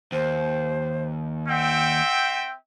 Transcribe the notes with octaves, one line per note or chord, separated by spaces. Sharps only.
D#2 C5
C4 E5 F#5 G5